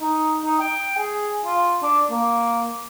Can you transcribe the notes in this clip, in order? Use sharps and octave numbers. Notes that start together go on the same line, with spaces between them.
D#4
D#4
G5
G#4
F4
D4
A#3